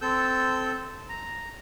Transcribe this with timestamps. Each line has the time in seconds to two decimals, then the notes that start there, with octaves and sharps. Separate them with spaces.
0.02 C4 A4 E6 G6
1.09 A#5